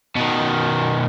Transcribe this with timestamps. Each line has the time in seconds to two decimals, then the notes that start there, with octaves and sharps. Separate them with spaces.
0.16 B2 D#3